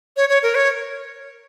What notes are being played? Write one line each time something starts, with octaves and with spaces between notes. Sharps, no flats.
C#5
C#5
A#4
C#5